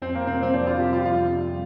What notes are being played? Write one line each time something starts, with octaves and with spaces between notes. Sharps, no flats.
F2 C4
A#3
C3 G3 C4
C4
F2 D4
F4
C3 G3 G4
F4
F2 F4
C3 G3